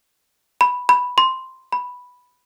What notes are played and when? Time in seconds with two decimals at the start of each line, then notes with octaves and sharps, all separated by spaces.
0.61 B5
0.89 B5
1.18 C6
1.72 B5